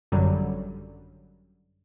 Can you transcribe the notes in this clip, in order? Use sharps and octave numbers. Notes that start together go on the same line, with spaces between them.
G#1 F#2 D3 F#3 G3